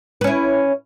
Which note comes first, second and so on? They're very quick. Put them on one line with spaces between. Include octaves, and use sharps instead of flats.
B4 C#4 E4